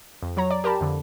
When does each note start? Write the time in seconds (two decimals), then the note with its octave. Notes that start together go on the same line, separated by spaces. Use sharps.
0.23 F2
0.37 F#3 C#5 A#5
0.50 D5
0.64 G4 A#4 A5 B5
0.81 F2 D3